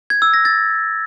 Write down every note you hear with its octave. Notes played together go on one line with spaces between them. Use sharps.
G#6
E6
A#6
A6